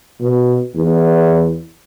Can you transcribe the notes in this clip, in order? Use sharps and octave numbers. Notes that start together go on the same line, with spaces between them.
B2
E2